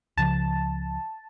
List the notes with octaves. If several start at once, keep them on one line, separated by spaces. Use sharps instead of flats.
C#2 C#3 F3 A5